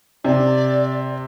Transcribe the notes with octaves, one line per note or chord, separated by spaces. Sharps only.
C3 D5